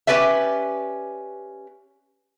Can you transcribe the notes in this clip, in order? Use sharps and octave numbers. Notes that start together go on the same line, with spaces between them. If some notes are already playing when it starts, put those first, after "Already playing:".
C#4 G4 B4 D5 E5